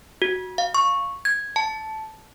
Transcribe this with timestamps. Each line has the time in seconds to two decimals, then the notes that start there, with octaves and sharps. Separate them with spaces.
0.22 F#4
0.58 F5
0.74 C#6
1.25 G#6
1.56 A5